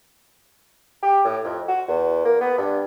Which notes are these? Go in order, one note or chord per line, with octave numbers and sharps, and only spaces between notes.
G4
A2
F2
F#4
E2
A#3
B3
G2